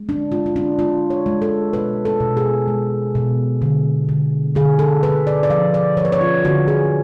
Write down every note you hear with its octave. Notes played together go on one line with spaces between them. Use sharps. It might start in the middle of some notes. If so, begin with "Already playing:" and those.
Already playing: G#3
D4
G#3 F4
F4
D4
G#3 F4
C#5
G#3
A4
B2 B4
A4
B2
G#4
G#3
B2
D3
D3
D3 G#4
A4
D3 B4
D5
D5
F3 F5
D5
F3 C#5
B4
C#5
F4
D3 F#4
G#4